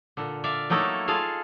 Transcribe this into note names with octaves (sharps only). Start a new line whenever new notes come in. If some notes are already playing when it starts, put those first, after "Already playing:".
A#2 D3
D5 E5 F5
F#3 A3 A#3 D#4 E4 A4
F4 G#4 A4 F5